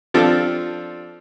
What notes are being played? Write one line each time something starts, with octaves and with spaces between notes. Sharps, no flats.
F3 C4 D4 F4 A4